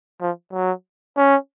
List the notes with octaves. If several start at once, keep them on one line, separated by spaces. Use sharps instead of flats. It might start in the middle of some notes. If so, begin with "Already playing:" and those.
F3
F#3
C#4